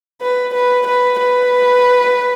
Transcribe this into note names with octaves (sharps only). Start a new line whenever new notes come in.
B4
B4
B4
B4